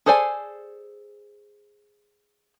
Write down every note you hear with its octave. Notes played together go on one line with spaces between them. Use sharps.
G#4 A4 C5 D5 G#5